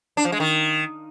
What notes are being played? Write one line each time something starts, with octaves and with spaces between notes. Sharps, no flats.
D4
F3
G#3
D#3